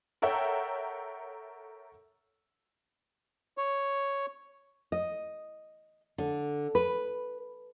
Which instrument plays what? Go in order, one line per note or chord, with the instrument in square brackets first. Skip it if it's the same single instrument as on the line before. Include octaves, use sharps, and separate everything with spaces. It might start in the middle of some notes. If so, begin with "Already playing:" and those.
[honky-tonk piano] A4 A#4 C#5 E5 F#5 G5
[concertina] C#5
[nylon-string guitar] D#5
D3
B4